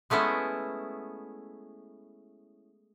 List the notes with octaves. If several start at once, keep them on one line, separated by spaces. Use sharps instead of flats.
G#3 A3 B3 C#4 E4